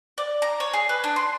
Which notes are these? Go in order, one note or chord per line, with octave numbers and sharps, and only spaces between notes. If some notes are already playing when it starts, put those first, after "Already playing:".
D5
A#5
C#5
G#4
B4
D4
C6